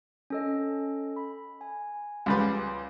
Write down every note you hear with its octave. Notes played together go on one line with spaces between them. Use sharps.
C#4 A4 D#5
B5
G#5
C#2 G3 B4